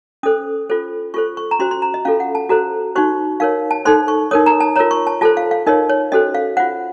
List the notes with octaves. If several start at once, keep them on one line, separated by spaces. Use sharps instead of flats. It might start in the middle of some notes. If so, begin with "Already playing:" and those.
C#4 A4 C5 D#6
F4 A4 C5
F4 A4 C5 C#6
C#6
A#5
C#4 F#4 C5 C6
C6
A#5
D#5
C#4 F4 A4 F5
F#5
A5
F#4 A4 C5 A#5
D#4 F#4 C5 C#6
D#4 A#4 C#5 F5
A5
D#4 A4 C5 C6
C#6
D#4 A#4 C#5 D#6
A#5
A5
F4 A#4 C#5 A#5
C#6
A5
F4 A4 C5 A5
F5
F5
D#4 A#4 C#5 D#5
C#5
C#4 F#4 A4 C5 D#5
F5
F4 C5 F#5